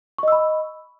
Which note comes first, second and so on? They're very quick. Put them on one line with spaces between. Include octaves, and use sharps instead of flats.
C#6 D#5 E6 B5